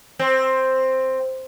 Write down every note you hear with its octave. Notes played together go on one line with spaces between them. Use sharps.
C4